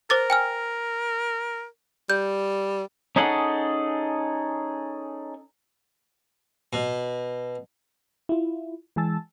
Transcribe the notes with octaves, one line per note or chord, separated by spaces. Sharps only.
A#4 C5 D6 A6
G5 G#5 F6
G3 G6
C#4 D#4 G#4 A4 F#5
B2
E4 F4
E3 G#3 G#5 A5 E6 A6